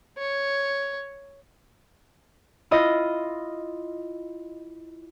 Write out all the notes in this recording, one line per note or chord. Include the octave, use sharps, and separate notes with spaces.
C#5
E4 F4 D#5